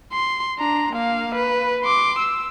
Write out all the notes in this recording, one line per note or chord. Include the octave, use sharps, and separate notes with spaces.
C6
D4 A#5
A#3 F5
B4
C6 D6
E6